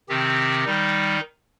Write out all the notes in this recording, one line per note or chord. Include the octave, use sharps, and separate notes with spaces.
C3 D#3 C4 G4
D#3 G3 D#4